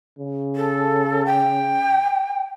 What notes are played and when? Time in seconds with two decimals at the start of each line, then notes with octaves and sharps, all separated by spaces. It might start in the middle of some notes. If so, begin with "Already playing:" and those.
0.19 C#3
0.56 A4
1.25 G5